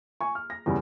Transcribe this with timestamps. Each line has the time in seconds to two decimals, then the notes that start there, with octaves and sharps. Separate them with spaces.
0.21 G#5 C#6
0.35 F6
0.50 A#6
0.66 E2 C#3 G3